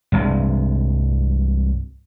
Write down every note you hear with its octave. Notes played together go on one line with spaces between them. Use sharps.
C2 G2 C3 G#3